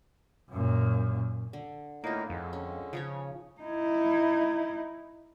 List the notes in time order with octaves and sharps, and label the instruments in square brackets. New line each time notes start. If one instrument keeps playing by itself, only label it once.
[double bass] F#2 A#2
[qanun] D3
[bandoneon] A2 D#4 [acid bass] A#3 [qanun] F4 B4
[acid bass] F2 [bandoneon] D3 G#3
[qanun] C#4
[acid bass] C#3 [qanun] F3 D#4 C#5
[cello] D#4 E4